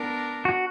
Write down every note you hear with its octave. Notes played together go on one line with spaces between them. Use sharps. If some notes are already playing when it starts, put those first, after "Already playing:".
Already playing: B3 D4 A#4
F#4